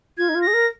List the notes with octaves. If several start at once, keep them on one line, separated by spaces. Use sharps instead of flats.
F4 G#6
D#4
F4
A#6
G#4
A#4